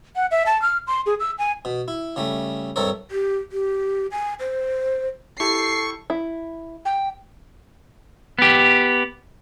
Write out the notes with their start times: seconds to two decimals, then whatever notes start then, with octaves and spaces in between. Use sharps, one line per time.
0.16 F#5
0.31 E5
0.46 A5
0.62 F6
0.87 C6
1.06 G#4
1.20 E6
1.39 G#5
1.65 B2
1.88 E4
2.16 C#3 G3 A3
2.76 G2 C3 A4 A#4 C#5
3.11 G4
3.52 G4
4.11 G#5
4.40 C5
5.40 E4 G4 A4 C#6 C7
6.10 E4
6.85 G5
8.39 B3 G4